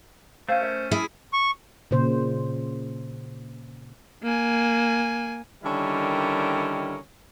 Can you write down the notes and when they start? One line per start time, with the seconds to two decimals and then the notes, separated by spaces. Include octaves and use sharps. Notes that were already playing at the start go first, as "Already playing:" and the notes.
0.49 A3 C#4 C5 F5 G5
0.61 A#4 E5
0.91 E4 G#4
1.33 C#6
1.91 A#2 C#3 C5
4.23 A#3 G#5
5.63 D3 D#3 G3 C#4 E4 A#4